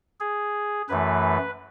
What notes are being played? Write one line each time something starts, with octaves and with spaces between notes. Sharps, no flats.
G#4
F#2 E3 A3 B4